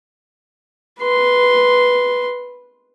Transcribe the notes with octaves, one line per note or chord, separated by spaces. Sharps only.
B4 C6